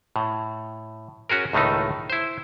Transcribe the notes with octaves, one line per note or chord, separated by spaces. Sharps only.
A2
C#4 F#4 G#4 A#4
C#2 A2 D#3 A3 D#4
E4 C5